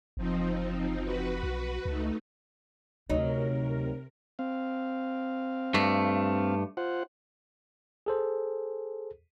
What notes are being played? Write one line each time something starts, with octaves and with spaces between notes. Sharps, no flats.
F#1 F3 C4 D#4
F#4 B4
B1
C#2 A3 D#4
D2 C3 F#3 D#4 A#4
C4 F5
G2 A3
F4 C5 F#5
G#4 A4 C5